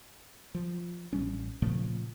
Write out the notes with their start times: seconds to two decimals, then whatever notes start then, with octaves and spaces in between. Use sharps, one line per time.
0.55 F3
1.13 A1 D3 G3 C#4
1.62 A#2 C#3 F3 A3